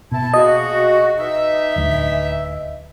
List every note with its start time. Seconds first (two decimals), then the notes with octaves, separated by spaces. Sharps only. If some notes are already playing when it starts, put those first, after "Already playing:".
0.12 B2 E4 A5
0.34 G#3 A#3 F#4 D#5
1.19 E3 D#4 E5
1.76 D1 D2